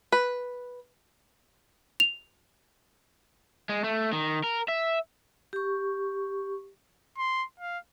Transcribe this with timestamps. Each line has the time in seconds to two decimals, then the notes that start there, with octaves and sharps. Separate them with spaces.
0.12 B4
2.00 F7
3.69 G#3
3.84 A3
4.13 D#3
4.44 A#4
4.68 E5
5.53 G4 C#6
7.18 C6
7.59 F5